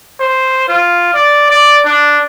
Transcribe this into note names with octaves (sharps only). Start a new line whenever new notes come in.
C5
F4
D5
D5
D4